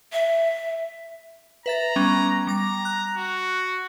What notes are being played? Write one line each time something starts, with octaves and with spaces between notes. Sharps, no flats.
E5
B4 E5 A#5 A6
G3 B3 C#4
G3 A#5 D6 A#6
F#6
F#4